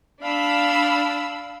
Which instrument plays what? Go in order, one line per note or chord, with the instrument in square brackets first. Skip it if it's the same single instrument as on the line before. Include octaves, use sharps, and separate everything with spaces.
[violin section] D4 B5 E6 [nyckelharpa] F5